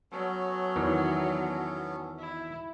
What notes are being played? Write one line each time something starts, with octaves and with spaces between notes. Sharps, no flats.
F#3 B3 C#4 A4
E2 D#3 E3
E4